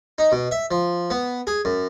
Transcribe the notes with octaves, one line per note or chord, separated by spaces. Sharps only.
D#4
B2
E5
F3
B3
G#4
F#2